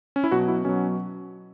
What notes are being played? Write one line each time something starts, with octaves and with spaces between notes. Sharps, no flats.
C#4
E4
B2 F#3 F#4
E4
B2 F#3 C#4